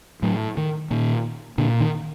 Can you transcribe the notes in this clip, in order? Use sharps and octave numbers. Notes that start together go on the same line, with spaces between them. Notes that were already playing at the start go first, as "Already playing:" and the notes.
A2 F#3
D#3
A#2 D#3
A#2 D3
D#3